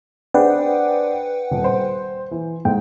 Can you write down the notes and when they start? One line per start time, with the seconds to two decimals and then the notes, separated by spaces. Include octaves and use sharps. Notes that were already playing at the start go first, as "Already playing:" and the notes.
0.34 D4 G#4 B4 C5 F#5 G5
1.51 D#1
1.64 C5
2.31 E3
2.65 G#2 G5